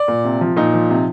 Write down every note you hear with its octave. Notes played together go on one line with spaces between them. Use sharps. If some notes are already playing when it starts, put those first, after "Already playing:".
Already playing: D5
A#2
C3
F3
A#2 D#4
F3
C3